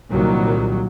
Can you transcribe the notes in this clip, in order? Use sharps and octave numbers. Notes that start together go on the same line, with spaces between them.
C2 A#2 D#3 F#3